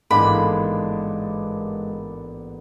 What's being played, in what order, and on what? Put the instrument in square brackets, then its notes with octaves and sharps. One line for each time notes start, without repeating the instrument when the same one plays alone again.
[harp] A1 G#2 [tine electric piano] G#3 [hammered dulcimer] A#3 B3 D4 [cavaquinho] B5